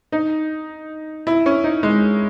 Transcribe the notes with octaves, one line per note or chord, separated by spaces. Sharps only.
D#4
E4
C#4
D#4
G#3